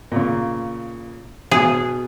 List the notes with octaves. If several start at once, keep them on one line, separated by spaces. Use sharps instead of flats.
A#2 C#3
B2 B3 G#4